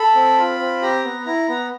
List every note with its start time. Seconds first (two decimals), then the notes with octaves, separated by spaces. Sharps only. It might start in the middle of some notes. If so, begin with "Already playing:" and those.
Already playing: A4 B5
0.15 C4
0.38 F4
0.60 C4
0.82 G4 A#5
1.05 B3
1.26 E4 A#5
1.48 B3